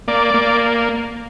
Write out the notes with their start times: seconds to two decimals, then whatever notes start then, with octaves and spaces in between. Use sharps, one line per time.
0.08 A#3 D5
0.34 A#3